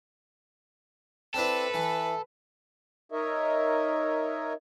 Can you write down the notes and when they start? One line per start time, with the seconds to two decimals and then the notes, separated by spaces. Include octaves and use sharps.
1.34 C4 D4 E4 A4 B4
1.74 E3
3.11 D#4 A#4 C#5 D#5 E5